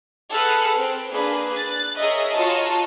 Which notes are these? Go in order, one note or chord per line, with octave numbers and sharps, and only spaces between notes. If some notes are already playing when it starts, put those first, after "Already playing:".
G#4 A4 B4 F#5 F6 F#6
C4
A#3 D4 G#4 B4
F#6 A6
G#4 A#4 C#5 D#5 E5
F4 F#4 C#5 D#5 A5 A#5